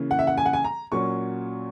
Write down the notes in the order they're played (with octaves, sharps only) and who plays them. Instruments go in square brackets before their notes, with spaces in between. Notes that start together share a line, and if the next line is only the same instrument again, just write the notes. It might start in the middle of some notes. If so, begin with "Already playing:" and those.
Already playing: [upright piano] C#3 E3 A#3 C#4
F#5
E5
F#5
G#5
F#5
G#5
A#5
A#2 F#3 C#4 C#6